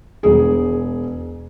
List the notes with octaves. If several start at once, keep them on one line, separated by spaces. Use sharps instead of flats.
E1 G#4